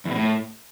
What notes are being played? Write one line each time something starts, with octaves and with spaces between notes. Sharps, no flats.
E2
B2
A2